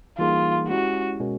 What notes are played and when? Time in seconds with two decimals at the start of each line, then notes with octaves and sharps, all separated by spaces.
0.18 E3 G3 A#3 D#4 F4 G#4
0.68 G#3 C#4 E4 F#4 G4
1.20 B2 G#3 C#4 F#4 A#4